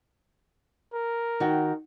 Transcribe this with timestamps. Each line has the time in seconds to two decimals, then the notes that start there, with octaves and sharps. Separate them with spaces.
0.94 A#4
1.40 D#3 F#4 G5